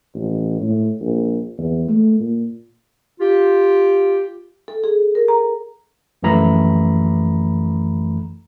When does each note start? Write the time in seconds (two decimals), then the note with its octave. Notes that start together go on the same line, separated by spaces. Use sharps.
0.15 A1
0.61 A2
1.01 A#1
1.58 E2
1.88 A3
2.20 A#2
3.20 F4 G4
4.68 A4
4.84 G#4
5.15 A#4
5.28 A#5
6.23 A#1 F#2 E3 A3 A#5 B5